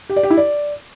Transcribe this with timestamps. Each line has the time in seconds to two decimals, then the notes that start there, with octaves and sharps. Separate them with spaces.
0.09 G4
0.16 D5
0.23 G4
0.30 E4
0.37 D5